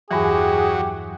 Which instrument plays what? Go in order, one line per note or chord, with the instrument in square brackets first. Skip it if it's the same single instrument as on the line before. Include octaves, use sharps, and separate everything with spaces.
[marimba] E2 G2 E3 [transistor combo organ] F#3 [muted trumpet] G4 [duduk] G#4